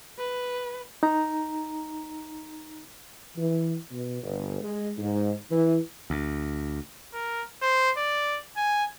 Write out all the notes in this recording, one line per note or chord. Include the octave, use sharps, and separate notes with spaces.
B4
D#4 A#5
E3
B2
G1
G#3
G#2
E3
D2
A#4
C5
D5
G#5